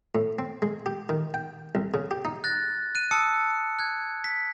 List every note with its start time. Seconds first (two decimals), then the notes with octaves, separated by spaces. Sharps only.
0.15 A2
0.39 C4
0.62 G#3
0.86 G4
1.09 D#3
1.34 G5
1.75 C2
1.94 C#3
2.11 G4
2.25 D#4
2.44 F#6 A6 A#6
2.95 F#6 D#7
3.11 A5 D#6 E6 C#7
3.79 F#6 G#6
4.24 B6